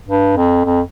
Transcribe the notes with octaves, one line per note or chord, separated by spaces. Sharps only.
G2
F2
F2